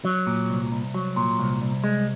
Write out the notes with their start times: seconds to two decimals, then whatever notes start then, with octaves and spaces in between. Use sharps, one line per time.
0.05 F#3
0.27 A#2
0.50 C2
0.72 C2
0.94 F#3
1.16 A#2
1.39 C2
1.62 C2
1.84 G#3